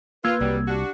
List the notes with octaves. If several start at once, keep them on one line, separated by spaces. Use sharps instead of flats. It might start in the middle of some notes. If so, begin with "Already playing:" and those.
A#3 F4 B4 E6 G#6
C2 F#3 G3
D4 F#4 G4